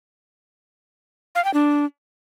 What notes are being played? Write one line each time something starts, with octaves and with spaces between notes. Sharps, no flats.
F5
G5
D4